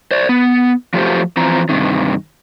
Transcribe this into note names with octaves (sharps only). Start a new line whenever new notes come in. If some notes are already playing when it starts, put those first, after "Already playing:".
C5 D5
B3
F3 F#3 A3 F4 G4 C5
E3 F3 C4 A#5
G2 C3 D#3